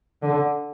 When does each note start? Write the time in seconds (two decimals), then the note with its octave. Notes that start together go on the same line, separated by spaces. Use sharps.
0.22 D3